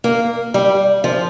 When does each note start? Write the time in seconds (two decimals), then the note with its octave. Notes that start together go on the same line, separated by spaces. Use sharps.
0.04 A#3
0.54 G3
1.04 F3